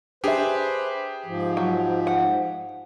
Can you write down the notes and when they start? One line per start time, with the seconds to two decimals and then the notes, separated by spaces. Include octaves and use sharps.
0.24 D4 G4 G#4 B4 C5 E5
1.26 G#2 F3
1.57 F#3
2.07 F#5